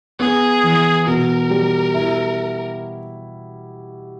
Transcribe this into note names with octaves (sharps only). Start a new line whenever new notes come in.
B3 G#4
E3
B2 A#4
G3
E4